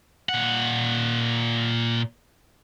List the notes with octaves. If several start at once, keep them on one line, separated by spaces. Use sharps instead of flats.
A#2 F#5